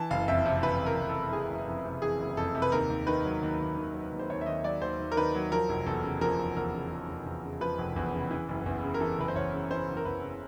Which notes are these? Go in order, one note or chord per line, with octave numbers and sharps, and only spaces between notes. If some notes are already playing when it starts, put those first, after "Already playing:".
Already playing: E3 A5
F#1 F5
F2 E5
C3
E3 B4
F#1
A#4
F2
A4
C3
E3 G#4
F#1
F2
C3
E3 G#4
F#1
F2 A4
C3
B4
D#2 A#4
D#2
D#3 B4
F#3
D#2
D#2
D#3
F#3
D#2
C5
D#2 C#5
E5
D#3 D#5
F#3 D5
D#2 C5
D#2
A#4
D#3 B4
F#3
F3 A#4
F1
E2 A4
C#3
F3 A#4
F1
E2 A#4
C#3
F3
F1
E2
C#3
F3 B4
F1
E2
C#3
E3
F#1
E2
C#3
A#4
E3 A4
F#1 B4
C5
E2 C#5
C#3
E3 C5
F#1
A#4
E2 B4
C#3